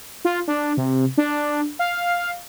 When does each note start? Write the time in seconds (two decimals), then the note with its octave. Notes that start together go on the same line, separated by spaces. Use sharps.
0.25 F4
0.48 D4
0.77 C3
1.18 D4
1.79 F5